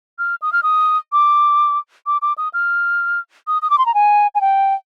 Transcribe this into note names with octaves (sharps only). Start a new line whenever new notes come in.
F6
D#6
F6
D#6
D6
D6
D6
D#6
F6
D#6
D#6
D6
C6
A#5
G#5
G#5
G5